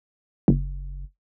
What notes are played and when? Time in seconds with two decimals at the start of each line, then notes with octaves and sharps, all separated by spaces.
0.48 F#1